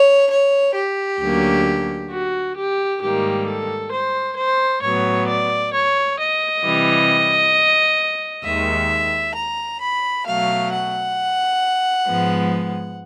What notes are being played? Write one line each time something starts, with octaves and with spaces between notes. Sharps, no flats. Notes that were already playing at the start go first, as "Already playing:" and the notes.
Already playing: C#5
C#5
G4
D2 D3 F#3 A#3 C#4
F#4
G4
G#2 D#3 G3 A#3 G4
A4
C5
C5
A2 F#3 B3 C#5
D5
C#5
D#5
C3 E3 G3
D#2 D#3 G#3 E5
A#5
B5
B2 F#3 A3 F5
F#5
G#2 F3 G#3 B3